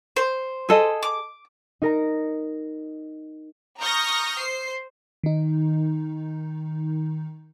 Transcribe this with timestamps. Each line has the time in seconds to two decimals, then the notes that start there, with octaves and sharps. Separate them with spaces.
0.16 C5
0.69 G#4 A4 D#5
1.03 D6
1.82 D#4 A#4 A#5
3.80 A#5 C#6 D#6 F6 G6 A#6
4.38 C5 C7
5.23 D#3 D#4